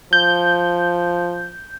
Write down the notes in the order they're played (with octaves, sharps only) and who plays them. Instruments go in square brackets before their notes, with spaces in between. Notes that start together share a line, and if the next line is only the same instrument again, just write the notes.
[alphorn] F3 [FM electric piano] G6